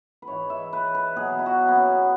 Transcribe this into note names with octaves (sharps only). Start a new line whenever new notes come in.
B4
G#2 E3 G#3 C#5
E5
B4
B4
B2 F#3 G#4
E4
F#4
B3
C#4